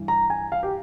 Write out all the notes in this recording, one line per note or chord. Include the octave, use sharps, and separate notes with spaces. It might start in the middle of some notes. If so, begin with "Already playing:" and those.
Already playing: G2 E3
A#5
G#5
F5
G4